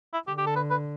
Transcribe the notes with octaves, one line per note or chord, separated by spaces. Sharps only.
E4
D3 G4
G4
A4
B4
B4